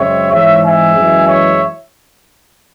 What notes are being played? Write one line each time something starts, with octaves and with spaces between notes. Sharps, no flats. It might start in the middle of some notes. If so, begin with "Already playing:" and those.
Already playing: F#2 C#3 G#3 C4 C#5 E5
G#2 E3 G#3 C4 C#5 E5
E5 G#5
F#2 E3 G#3
C#5 E5